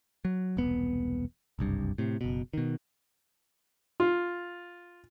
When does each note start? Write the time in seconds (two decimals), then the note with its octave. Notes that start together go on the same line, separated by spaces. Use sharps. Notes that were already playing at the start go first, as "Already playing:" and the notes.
0.25 F#3
0.57 E1 C2 B3
1.59 F#1 C2 G2
1.98 A2 C3
2.21 F#1 B2
2.53 B2 D#3
4.00 F4